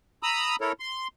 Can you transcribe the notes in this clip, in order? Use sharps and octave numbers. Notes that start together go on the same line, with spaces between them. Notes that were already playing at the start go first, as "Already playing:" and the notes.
A#5 B5 D#6 E6
E4 A4 A#4 C#5
C6